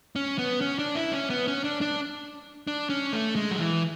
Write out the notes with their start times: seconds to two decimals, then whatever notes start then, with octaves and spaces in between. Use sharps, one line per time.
0.16 C#4
0.38 B3
0.61 C#4
0.79 D4
0.95 E4
1.13 C#4
1.30 B3
1.48 C#4
1.64 D4
1.81 D4
2.67 D4
2.90 C#4
3.13 A3
3.36 G#3
3.51 F#3
3.58 E3